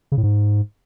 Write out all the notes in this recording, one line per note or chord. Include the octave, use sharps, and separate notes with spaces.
C#3
A2
G#2